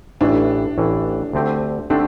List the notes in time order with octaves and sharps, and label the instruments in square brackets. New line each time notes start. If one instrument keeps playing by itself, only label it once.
[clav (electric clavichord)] A1 A2 E3 [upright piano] D4
[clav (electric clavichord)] A1 A2 E3
D2 D3 A3 C4 G4
[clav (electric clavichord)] D3 A3 C4 G4 [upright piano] D4